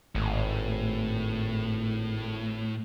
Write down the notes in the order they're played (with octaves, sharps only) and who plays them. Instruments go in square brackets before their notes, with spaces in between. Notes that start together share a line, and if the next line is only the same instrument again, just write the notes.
[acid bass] G#1 [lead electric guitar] A2